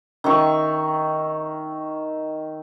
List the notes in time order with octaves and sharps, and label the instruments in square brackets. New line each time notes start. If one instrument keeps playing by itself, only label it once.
[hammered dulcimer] D#3 E5 C#6